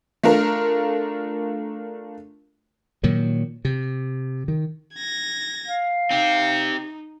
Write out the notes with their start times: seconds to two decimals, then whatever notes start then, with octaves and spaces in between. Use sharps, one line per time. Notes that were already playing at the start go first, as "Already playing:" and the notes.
0.23 A3 D4 F4 A#4
3.03 A#2 D#3 F#3
3.65 C3
4.48 D#3
4.94 G#6 A#6
5.67 F5
6.11 C4 D#4 G4